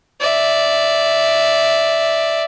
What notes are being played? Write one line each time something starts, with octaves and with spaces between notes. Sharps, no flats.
D5 E5